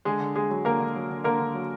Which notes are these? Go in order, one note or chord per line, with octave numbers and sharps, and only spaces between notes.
D3 G#3 G#4
D3
D3 G#3 G#4
F#3
D3 A#3 A#4
D3
F#3
D3
D3 A#3 A#4
D3
F#3